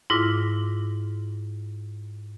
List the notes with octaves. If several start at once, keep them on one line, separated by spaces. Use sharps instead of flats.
G#2 E4 F4 D6 A#6